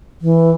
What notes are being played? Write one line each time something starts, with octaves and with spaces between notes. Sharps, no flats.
E3